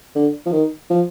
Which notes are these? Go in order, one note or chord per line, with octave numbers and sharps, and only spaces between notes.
D3
F3
D#3
F3